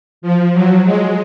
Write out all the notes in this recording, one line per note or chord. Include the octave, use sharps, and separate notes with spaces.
F3
F#3
G#3